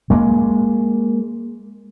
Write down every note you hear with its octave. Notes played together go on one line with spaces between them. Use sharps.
G#3 A#3